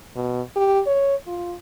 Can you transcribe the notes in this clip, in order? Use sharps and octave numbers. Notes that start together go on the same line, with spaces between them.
B2
G4
C#5
F4